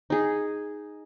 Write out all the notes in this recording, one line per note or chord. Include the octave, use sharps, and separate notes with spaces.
D#4 G#4